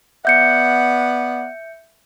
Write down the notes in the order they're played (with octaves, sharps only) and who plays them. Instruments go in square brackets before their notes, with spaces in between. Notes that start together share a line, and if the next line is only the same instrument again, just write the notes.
[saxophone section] B3 D5 F#5 [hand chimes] E5 G6 C#7